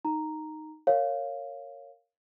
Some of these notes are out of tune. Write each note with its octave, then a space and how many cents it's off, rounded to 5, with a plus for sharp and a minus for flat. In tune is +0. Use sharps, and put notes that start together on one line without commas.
D#4 +0 A#5 -5
A#4 -10 C#5 +0 F5 +0